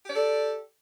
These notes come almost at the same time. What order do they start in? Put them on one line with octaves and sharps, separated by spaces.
G4 D5 A4